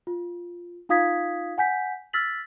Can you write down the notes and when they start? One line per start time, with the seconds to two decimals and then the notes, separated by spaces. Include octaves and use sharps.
0.07 F4
0.89 D#4 F4 F5 D#6 G#6 B6
1.58 F#5 G#5 G6 B6
2.13 E6 F6 A6 B6 F#7